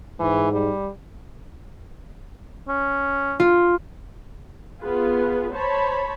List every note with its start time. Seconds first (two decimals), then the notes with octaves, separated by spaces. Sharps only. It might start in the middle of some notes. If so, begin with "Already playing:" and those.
0.19 G#2 E3
0.53 G3
2.68 C#4
3.40 F4
4.81 B3 F4 G#4 B4
5.52 C5 C#5 A5 B5